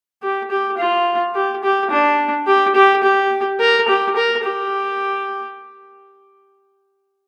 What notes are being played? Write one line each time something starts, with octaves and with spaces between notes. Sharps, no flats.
G4
G4
F4
G4
G4
D4
G4
G4
G4
A#4
G4
A#4
G4